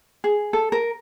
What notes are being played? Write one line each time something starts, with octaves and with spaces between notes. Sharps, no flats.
G#4
A4
A#4